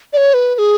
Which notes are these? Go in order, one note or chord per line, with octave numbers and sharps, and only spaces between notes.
D5
C#5
B4
B4
G#4